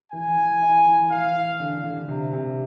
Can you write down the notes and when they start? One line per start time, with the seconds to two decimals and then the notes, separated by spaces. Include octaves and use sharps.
0.12 E3 G#5
0.37 E3
0.62 E4
0.85 E3
1.10 E3 F5
1.35 E3
1.60 D3
1.84 D3
2.08 C3
2.33 C3